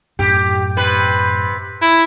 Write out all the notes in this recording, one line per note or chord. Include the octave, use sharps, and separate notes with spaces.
F#2 A2 G4
C3 B4
E4